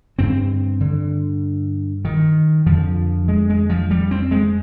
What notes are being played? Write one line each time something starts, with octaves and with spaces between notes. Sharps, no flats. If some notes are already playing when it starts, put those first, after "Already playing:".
G2 D3 C4
D3
D#3
F2 D3 F3
G#3
G#3
F3
G3
C4
G#3